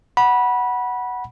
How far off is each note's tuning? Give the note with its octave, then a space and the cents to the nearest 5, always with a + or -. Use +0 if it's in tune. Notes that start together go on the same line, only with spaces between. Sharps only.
F#5 +5 B5 -20